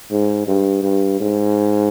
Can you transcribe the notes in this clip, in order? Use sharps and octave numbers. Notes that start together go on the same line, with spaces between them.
G#2
G2
G2
G#2